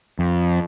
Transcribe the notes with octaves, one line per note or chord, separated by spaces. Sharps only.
F2